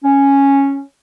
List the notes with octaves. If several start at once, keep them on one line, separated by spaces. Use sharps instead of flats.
C#4